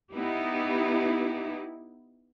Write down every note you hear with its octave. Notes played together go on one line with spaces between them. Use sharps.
B3 D#4 E4 G4